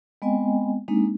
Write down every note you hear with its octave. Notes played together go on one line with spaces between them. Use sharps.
G#3 B3 C4 D#5 G5 G#5
G#3 A#3 C4 D4 D#4